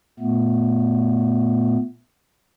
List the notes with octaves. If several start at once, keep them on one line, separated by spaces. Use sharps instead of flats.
A#2 A3 B3